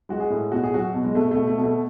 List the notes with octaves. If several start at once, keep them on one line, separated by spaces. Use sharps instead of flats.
G#3 F#4
G#4
A2
B2 F#4
G#4
F#3 F#4
B2
G#3
B2 A3
A3
B2
A3
B2
A3